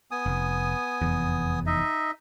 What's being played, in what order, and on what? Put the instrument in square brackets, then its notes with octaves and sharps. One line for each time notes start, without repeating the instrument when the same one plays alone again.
[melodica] B3 G#5 D#6
[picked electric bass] F1
F1 E2
[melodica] D#4 D#5 E5